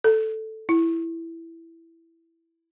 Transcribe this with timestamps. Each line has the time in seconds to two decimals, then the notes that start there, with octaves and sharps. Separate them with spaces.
0.04 A4
0.69 E4